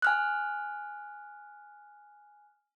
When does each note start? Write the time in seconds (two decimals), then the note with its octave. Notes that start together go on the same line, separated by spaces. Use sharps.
0.02 G#5 F6 F#6